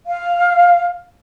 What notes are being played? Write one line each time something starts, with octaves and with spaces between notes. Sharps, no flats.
F5